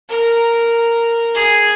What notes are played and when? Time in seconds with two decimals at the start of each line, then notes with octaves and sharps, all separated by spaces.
0.09 A#4
1.35 G#4